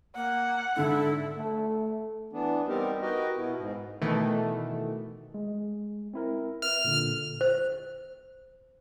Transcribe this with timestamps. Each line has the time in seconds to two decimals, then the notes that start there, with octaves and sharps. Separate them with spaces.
0.15 A#3 F#5
0.76 G#2 D3 E4 A4
1.37 A3
2.33 E3 B3 D4
2.68 G3 B3 C4 D#4 G4 A#4
3.02 F#4 A#4 B4 D#5 G5
3.37 B2 B3 E4
3.58 G#2
4.01 B2 D#3 E3 A3
5.34 G#3
6.14 C4 E4 A#4
6.62 B4 E5 F6
6.85 A#2 D3
7.41 C5